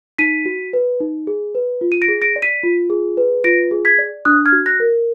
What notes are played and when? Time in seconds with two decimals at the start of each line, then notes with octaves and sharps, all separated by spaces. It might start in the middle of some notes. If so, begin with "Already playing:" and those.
0.18 D#4 B6 D#7
0.46 F#4
0.73 B4
1.00 D#4
1.27 G#4
1.55 B4
1.81 F4
1.92 D#7
2.02 A#6 D7
2.08 G#4
2.22 A#6 D7
2.36 D5
2.42 B6 D#7
2.63 F4
2.90 G#4
3.17 B4
3.44 F4 A#6 D7
3.71 G#4
3.85 G#6 B6
3.99 D5
4.25 D4 D#6 F#6
4.46 F6 G#6
4.52 F#4
4.66 F#6 A#6
4.80 A#4